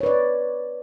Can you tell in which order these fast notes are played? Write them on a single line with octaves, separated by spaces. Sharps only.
C#5 B4 D5